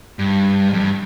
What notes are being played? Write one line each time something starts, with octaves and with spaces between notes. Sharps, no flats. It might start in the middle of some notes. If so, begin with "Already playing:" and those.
G2
F2
G2